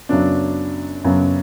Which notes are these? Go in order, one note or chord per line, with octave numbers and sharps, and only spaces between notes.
F#2 C#3 F#3 B3 D4
F#2 C#3 F#3 B3